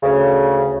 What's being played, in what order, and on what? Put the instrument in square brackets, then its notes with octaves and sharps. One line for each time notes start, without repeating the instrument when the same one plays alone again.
[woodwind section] D2 C#3